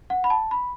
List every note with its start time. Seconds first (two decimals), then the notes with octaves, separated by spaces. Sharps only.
0.10 F#5
0.24 B5
0.30 A5
0.51 B5